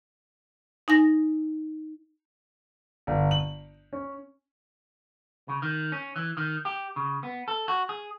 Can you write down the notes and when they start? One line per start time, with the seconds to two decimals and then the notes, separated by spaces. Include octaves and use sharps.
0.88 D#4 G#5 A#6
3.07 G1
3.31 F#7
3.93 C#4
5.48 C#3
5.62 D#3
5.92 C#4
6.16 E3
6.37 D#3
6.65 G4
6.96 C#3
7.23 B3
7.48 A4
7.68 F#4
7.89 G#4